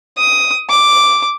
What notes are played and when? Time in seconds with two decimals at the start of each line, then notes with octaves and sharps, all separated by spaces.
0.17 D#6
0.70 D6